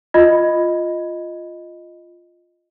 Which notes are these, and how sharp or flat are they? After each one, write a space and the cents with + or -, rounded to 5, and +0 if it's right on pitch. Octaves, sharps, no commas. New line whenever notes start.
F4 +0 D#5 +0 B5 +0